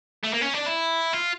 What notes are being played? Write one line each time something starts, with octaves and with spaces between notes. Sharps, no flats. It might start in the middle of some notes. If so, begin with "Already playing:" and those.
A3
A#3
C#4
D4
E4
F4